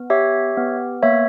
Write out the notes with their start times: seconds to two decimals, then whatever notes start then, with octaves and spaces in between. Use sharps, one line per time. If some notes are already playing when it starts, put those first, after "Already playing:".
Already playing: B3
0.10 G4 C#5 E5
0.57 B3
1.03 A#3 C#5 E5